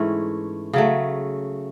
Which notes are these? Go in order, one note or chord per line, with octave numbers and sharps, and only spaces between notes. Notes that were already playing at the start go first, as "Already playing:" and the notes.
Already playing: G#2 E3 A3 C#4
C#3 F#3 A3